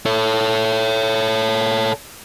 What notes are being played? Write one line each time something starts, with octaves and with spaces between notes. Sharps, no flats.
A4 C#5